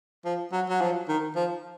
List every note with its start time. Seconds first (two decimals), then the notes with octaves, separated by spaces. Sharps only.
0.25 F3
0.52 F#3
0.69 F#3
0.81 F3
1.08 D#3
1.35 F3